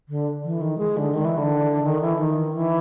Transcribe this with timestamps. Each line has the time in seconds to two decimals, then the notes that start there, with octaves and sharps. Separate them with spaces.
0.09 D3
0.44 E3
0.61 D#3
0.78 G#3
0.97 D3
1.14 D#3
1.25 E3
1.37 D3
1.84 D#3
2.01 E3
2.19 D#3
2.54 E3